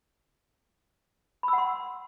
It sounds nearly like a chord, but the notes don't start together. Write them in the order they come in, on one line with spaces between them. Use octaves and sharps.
B5 E6 F#5 C6